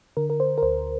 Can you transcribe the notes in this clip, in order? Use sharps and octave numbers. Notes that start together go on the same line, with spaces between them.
D3 A#4
A#4
C5
A#4
D2 C5